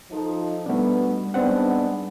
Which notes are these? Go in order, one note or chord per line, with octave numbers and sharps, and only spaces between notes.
F3 D#4 A4
B2 G3 A3 B3 D4
G#2 B3 C4 D4 F#5